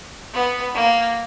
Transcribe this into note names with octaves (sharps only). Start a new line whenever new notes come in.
B3
A#3